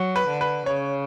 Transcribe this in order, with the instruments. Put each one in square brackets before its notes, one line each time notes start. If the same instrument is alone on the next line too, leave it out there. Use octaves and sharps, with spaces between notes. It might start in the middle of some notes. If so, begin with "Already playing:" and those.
Already playing: [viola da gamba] F#3
[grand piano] B4
[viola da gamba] D3
[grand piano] B4
[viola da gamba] C#3 [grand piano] C#5